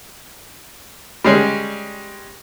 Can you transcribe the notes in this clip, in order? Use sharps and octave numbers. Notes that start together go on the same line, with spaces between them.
G3 G#3 C#4